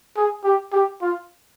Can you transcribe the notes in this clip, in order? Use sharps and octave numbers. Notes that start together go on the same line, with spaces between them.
G#4
G4
G4
F4